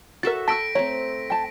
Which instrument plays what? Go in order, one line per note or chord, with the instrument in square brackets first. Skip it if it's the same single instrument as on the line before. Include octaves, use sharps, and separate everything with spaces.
[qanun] F#4 A4 E5 [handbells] A#4 A6
[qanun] G5 B5 C#6 [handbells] A5 E6 [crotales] A#6 B6 D7
[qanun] A3 C4 [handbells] C#5 [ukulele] A#5
[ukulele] G5 A5